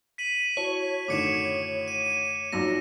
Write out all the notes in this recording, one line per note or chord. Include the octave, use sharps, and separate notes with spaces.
B6 D#7 F#7
E4 F#4 C#5 A5
F#2 A2 D3 D#3 A3 D6 C#7 E7
D#7
A#1 F#2 D#4 F4 D5 A#6